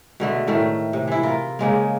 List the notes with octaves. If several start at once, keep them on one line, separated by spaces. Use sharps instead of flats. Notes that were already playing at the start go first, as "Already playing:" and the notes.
B2 D3 A3
A2 D#3 A3
C3
E3 E4
F4 A#4
C#3 G#3 A#3